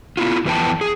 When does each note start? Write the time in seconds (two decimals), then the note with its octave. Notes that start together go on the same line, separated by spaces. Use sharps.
0.17 B3 E4 F4
0.45 F2 E3 B3 C#4 G5 A5
0.81 G#4